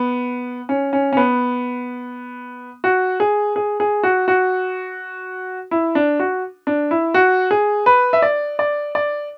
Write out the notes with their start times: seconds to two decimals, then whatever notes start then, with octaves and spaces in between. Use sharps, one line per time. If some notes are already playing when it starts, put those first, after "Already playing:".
Already playing: B3
0.69 C#4
0.93 C#4
1.13 C#4
1.17 B3
2.84 F#4
3.20 G#4
3.56 G#4
3.80 G#4
4.03 F#4
4.28 F#4
5.71 E4
5.95 D4
6.20 F#4
6.67 D4
6.91 E4
7.14 F#4
7.51 G#4
7.86 B4
8.13 E5
8.22 D5
8.59 D5
8.95 D5